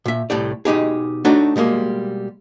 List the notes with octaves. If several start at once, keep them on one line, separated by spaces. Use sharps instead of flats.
A#2 E5
C2 A2 G4 D5
B2 D#4 G4 G#4
A3 D4 D#4 F#4 C#5
B2 G3 G#3 A#3